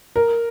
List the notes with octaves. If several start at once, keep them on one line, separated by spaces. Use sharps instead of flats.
A#4